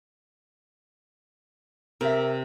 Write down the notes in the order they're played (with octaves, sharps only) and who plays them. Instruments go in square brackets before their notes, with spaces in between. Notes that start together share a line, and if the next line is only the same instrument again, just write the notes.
[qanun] C3 [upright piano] A#4 E5